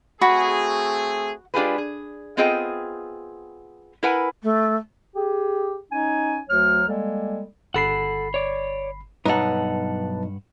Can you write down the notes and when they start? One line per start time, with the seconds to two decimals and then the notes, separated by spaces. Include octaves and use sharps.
0.21 A3 C4 F#4 G#4 B5
1.54 G#3 D4 F4 G4 G#4 B4
1.78 G#4
2.37 B3 C4 F4 G#4 D#5 G5
4.03 E4 A#4 B4 F#5 G#5
4.43 A3
5.16 G4 G#4
5.91 C#4 D#4 G#5
6.49 D2 F#3 C#5 F6
6.87 G3 G#3 A#3 A4
7.74 G1 A4 F#5 B5 C7
8.34 C#5 D5
9.26 B1 G2 D#4 B4 F#5 A5